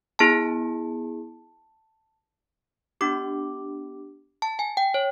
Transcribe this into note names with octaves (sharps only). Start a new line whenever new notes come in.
B3 E4 G#4 A5
B3 D4 G4 D6
A5
G#5
G5
C#5